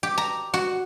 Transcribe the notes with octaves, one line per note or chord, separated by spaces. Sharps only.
G4
A#5
F#4